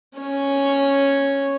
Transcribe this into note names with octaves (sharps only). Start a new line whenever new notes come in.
C#4 C#5